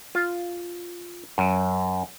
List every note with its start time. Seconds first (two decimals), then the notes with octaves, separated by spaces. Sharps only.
0.15 F4
1.38 F#2